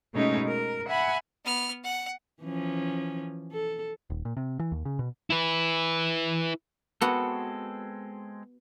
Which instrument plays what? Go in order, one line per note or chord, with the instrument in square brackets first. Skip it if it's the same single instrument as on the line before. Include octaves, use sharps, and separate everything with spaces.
[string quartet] B2 G#3 A3 C#4 D#4
A#4
E5 F#5 G#5 B5
[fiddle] B3 F6
F#5
[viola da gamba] E3 F3 C#4
A4
[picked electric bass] D#1
A#2
C3
E3
D#2
C#3
B2
[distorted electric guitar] E4 B4
[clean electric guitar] G#3 C4 A4 [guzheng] B3 F#4